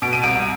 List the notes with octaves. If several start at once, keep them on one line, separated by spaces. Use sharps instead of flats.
B2 D7
D#7
C2 D7